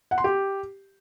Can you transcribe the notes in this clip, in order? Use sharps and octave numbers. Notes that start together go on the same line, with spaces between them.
F#5
C6
G4